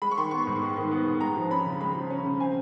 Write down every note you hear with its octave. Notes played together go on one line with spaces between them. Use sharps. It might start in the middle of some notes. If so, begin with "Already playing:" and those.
G#3 B5
C#6
D#3 C6
B3 C#6
G#2
G#3
D#3
B3
G#2
G#3 A#5
F3
C#4 B5
C#3
G#3 B5
F3
C#4
C#3
C4 G#5